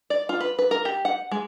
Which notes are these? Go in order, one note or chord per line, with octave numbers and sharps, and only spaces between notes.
D5
F4
B4
B4
A#4
G4
F#5
G#3